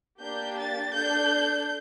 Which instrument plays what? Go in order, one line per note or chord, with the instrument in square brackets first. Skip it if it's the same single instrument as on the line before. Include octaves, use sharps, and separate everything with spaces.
[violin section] A#3 D4 G4 G6
A6
D4 A4 G6